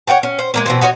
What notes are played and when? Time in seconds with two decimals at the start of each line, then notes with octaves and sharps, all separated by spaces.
0.07 C#5 F#5 G5 A5
0.23 C#4
0.39 C5
0.54 G#3 A#3 C4
0.66 B2 E3 C4
0.81 D#4 F#4 C5 C#5